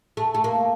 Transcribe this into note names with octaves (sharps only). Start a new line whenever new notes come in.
A3
A3
A#3